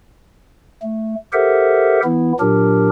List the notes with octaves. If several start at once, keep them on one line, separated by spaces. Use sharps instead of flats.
A3
G4 A4 A#4 C5 E5 F#5
E3 B3 E4
A#2 F#3 D4 G4 A#4